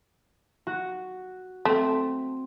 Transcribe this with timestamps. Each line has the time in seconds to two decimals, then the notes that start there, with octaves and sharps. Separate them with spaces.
0.67 F#4
1.65 A3 C4